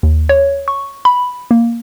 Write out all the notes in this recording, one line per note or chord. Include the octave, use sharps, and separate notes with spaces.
D#2
C#5
C#6
B5
A#3